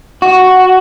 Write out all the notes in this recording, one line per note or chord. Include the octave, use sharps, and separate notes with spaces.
F#4